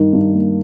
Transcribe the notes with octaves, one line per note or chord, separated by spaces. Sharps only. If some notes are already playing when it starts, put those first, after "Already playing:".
Already playing: G2 D#3
G2
A#3